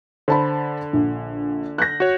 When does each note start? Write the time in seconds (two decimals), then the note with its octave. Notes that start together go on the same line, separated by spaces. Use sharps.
0.28 D3 C5 A5 B5
0.93 A#1
1.78 F#6 G6 A#6
2.00 F#4 C#5